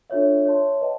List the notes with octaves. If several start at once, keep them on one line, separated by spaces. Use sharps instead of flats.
D4 F4 A4 C#5 E5
C#5 E5 A5 C6
B4 D#5 F#5 A5